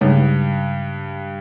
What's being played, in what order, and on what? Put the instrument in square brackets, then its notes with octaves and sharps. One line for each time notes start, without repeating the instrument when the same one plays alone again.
[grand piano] G2 [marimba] C#3 G#3 D#4 G#4 C#5